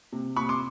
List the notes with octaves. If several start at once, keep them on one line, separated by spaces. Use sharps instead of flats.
C3
C3 B5 C#6
C6 D6